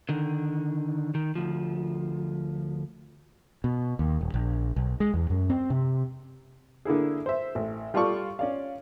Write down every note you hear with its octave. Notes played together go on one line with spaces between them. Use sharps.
D3 D#3
D#3
D2 F3
B2
D#2
D#1
A#1
B1
G#3
E2
F#2
C4
C3
D3 A#3 E4 G#4
C5 E5
A1
G3 F4 A4 D5 C#6
C#4 D5 F5